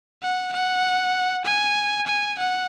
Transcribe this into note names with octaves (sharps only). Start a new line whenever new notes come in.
F#5
F#5
G#5
G#5
F#5